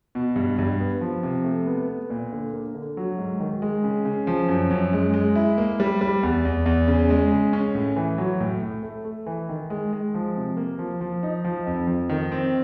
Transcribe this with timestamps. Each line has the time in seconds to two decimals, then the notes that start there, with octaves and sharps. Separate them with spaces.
0.15 B2
0.36 G2
0.59 G2
0.79 B3
1.01 F3
1.23 C3
1.44 A3
1.66 B3
1.88 B3
2.10 A#2
2.32 D3
2.53 A#3
2.75 D3
2.97 F#3
3.18 G#2
3.40 D#3
3.62 G#3
3.84 C#3
4.05 C#3
4.27 F3
4.48 F#2
4.71 F#2
4.93 G#3
5.14 G#3
5.36 E4
5.58 A#3
5.80 G3
6.01 G3
6.23 E2
6.45 E2
6.66 E2
6.87 C#3
7.10 G#3
7.32 C#3
7.53 C#4
7.75 A2
7.96 E3
8.18 F#3
8.40 A2
8.62 A2
8.83 A3
9.05 A3
9.26 E3
9.49 D#3
9.70 G#3
9.93 G#3
10.15 F3
10.36 C3
10.57 A#3
10.79 F3
11.01 F3
11.23 D#4
11.44 F3
11.67 F2
11.87 F3
12.09 D#3
12.32 C4